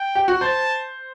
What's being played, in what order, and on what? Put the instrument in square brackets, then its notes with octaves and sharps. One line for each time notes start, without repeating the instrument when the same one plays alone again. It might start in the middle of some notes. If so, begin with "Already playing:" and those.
Already playing: [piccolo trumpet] G5
[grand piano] G4
F#4
[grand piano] C5 [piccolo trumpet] A5